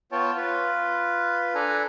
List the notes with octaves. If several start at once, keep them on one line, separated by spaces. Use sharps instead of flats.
B3 F4 C#5 G5 A5
F4 B4
D4 A4 B4 G#5 A#5